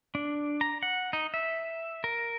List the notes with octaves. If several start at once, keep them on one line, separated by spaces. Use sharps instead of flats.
D4
A#5
F#5
D#4
E5
A#4